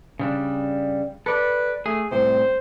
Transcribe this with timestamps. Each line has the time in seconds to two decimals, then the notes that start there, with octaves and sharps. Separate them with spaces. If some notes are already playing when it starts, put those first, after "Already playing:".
0.19 C#3 G3 D4
1.26 A4 B4 D5
1.86 A3 G#4
2.12 C2 A2 C3 C5